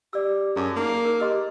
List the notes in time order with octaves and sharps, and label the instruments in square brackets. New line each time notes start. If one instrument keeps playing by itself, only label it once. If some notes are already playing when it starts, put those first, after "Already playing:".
[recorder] G4 [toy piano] D5 E6
[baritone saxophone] F#2 [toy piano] G#4 A5
[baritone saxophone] A#3 [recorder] D#4
[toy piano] G#4 A#4
[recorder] G4 [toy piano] A#4 D#5 C6